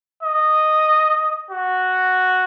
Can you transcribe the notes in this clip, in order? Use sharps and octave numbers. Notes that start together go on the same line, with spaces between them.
D#5
F#4